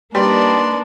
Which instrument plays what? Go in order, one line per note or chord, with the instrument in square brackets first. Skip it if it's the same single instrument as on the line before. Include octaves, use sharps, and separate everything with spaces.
[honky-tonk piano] G3 [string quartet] A#3 D4 D#4 [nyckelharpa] B4 D5 [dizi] C6